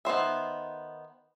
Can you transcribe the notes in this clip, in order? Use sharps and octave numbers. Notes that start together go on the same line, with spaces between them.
D#3 B3 C5 E5